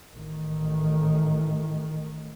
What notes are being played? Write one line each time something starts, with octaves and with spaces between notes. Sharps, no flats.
A1 D#3